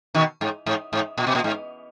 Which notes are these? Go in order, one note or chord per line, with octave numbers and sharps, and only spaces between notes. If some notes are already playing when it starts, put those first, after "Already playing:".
B2 D#3
G#2
G#2
G#2
A#2
B2
A#2
G#2